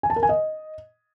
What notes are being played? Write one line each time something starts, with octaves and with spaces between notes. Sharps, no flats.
G#5
A5
A#4
G#5
D#5